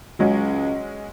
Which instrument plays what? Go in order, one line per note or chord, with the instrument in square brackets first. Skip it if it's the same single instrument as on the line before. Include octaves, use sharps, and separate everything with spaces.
[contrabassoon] C#2 [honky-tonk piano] F#3 G#3 C#4